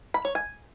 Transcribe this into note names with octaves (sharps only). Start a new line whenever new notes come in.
B5
C#5
G#5